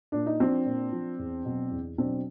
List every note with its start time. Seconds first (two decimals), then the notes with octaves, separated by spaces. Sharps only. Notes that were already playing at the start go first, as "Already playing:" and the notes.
0.12 A#2 D4
0.26 D#4
0.40 F3 C4 D4
0.66 A#2
0.92 F3
1.19 E2
1.45 B2 F#3
1.71 E2
1.98 B2 F#3 C4 D4